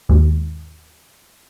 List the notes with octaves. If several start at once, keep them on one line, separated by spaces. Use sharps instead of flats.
D#2 G#2